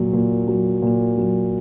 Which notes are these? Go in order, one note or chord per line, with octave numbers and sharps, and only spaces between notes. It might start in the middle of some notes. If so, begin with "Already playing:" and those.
Already playing: A#2 F#3
A#2
F#3
A#2
F#3